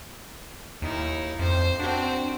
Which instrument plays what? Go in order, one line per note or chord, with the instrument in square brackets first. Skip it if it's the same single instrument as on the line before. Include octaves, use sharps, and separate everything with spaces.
[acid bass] D#2 [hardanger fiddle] D#4 E4
[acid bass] F2 [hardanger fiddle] C5
[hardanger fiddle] C4 F#4 [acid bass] D4